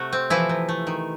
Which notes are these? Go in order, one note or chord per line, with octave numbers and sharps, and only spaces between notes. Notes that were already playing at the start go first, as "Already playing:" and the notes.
Already playing: C3 A3 F#4
C4
E3 F3 E4
C3
A3
D#3